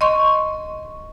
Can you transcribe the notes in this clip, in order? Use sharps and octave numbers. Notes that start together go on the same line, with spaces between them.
D#5 C6 C#6